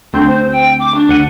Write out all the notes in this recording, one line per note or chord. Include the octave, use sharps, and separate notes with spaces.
D2 C4 D4 G6
C5
G5
D6
D4
D2 F#5 D#7